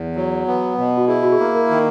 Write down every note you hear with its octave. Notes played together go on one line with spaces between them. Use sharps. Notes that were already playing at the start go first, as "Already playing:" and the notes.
Already playing: E2
F#3
B3
B2
F#4
E4 G#4
F#4
G#4
A#3
A#4
D#3